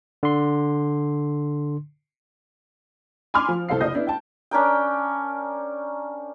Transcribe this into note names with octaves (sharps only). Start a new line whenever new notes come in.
D3 C6
G#5 B5 C6 D6 F6
F3
C2 A4 C5 F5 C7
F#1 D5 D#5 G6
B3 D4 E4
G5 A5
C#4 D4 A#4 G5